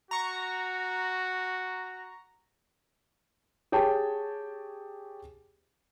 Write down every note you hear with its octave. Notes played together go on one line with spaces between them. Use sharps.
F#4 A#5 C#6
G4 G#4 C#5 G5 A5